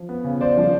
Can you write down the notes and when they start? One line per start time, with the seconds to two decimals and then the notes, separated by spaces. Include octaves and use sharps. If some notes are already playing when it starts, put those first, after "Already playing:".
Already playing: F3
0.09 B3
0.24 C#3
0.41 C#3 C5 D5
0.57 F3